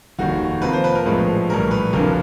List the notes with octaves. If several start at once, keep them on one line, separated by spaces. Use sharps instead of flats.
F1 D#2 D#3 F#4
F2 C3 F3 A#3 B4
C5
B4
A#4
A#1 A2 F3 G#3 B4
A#1 A2 E3 G3 A#4
B4
F#1 F2 D3 A#4